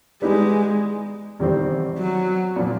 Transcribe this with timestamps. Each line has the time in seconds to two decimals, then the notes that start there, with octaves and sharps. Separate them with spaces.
0.22 G3 G#3 B3 D#4 G4
1.39 E2 C3 D#3 G3 C4
1.98 F#3
2.56 A#2 F3 A#3